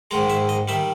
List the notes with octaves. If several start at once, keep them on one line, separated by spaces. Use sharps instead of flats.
A#1 G#2 D#3 G#3 A#5
E5
D#5
D#3 G3 E5